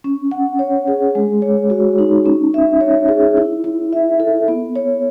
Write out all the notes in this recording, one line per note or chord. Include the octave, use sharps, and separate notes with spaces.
C#4
F#5
C#5
G#4
G#3
C#5
F#4
D#4
C#4
E5
C#5
G#4
E4
E4
E5
A4
B3
C#5